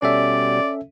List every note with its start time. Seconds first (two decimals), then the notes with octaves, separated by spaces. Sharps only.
0.02 B2 G3 C#4 A4 D5 E5